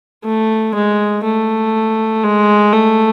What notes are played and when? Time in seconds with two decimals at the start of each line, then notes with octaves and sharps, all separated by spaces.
0.24 A3
0.74 G#3
1.24 A3
2.24 G#3
2.73 A3